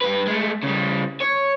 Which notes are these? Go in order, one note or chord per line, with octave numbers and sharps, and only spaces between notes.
G2 B4
G#3 A3
C#3 G3
C#5